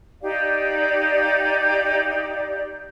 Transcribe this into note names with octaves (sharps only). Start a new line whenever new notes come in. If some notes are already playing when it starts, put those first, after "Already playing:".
D#4 G4 D5 F5